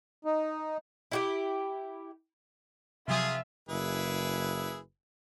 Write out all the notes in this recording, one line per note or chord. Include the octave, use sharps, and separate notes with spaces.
D#4
E4 F#4 G4
C3 F3 F#3 F4 G#4 E5
F#1 E4 G#4 B4